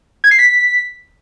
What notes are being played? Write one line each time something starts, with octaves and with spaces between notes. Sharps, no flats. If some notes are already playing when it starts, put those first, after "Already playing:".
G#6
C7
B6